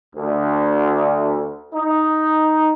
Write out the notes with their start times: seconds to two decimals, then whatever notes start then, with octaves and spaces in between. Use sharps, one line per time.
0.16 D2
1.74 D#4